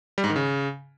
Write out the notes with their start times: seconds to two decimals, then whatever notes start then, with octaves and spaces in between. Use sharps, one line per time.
0.18 G3
0.24 G#2
0.30 D#3
0.36 C#3